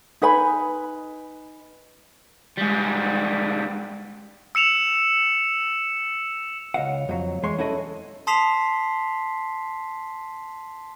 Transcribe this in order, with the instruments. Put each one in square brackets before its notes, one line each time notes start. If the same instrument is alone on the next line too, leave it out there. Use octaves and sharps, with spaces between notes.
[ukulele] D#4 B4 G#5 B5
[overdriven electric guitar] G#2 G3
[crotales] E6 C#7 E7 F7
[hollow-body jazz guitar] C#2 D#5 F5 F#5
F2 F#3
E2 G#3 C#5 C6
C#4 E4 F#4 A4 D#5
[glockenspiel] A5 C6 D#6 B6 C7 F7